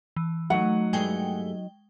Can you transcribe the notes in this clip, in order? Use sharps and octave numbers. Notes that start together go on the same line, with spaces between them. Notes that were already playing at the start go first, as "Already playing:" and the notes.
E3
F#3 A3 D#4 F#5
G2 G#3 A3 G#4 G5 G7